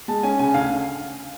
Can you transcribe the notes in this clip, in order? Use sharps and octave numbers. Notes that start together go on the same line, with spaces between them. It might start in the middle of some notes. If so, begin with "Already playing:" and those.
G#3 A5
C#4 G#5
C#3 G#5
D2 F5